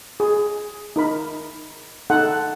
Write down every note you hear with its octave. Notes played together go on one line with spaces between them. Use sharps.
G#4
D#4 A#4 B5
D#4 A4 F#5